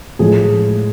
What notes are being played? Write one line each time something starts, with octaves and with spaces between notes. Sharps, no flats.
A2 F3 G#3 G#4